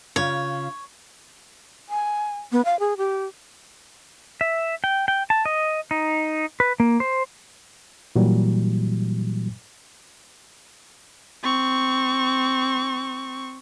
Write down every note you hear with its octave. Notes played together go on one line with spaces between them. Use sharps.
C#3 F4 C#5
G#5
B3
F5
G#4
G4
E5
G5
G5
A5
D#5
D#4
B4
A#3
C5
A#2 E3 F#3 G3
C4 C#6